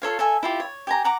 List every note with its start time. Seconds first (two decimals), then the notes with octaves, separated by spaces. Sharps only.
0.02 F4 A4 C#5 F5
0.19 A4 E5 G#5
0.43 E4 F4 G4
0.60 C#5
0.87 G4 G#5 A#5
1.04 F#5 A#5 D6